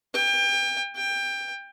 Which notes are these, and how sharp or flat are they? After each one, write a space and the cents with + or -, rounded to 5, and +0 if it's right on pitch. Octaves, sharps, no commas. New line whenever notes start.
G5 +30
G5 +20